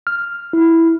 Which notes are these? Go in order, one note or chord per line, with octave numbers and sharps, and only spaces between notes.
F6
E4